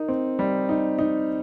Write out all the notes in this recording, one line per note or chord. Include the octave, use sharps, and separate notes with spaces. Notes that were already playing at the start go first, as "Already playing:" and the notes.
Already playing: D#4 A#4
C4
G3
D#4
D#4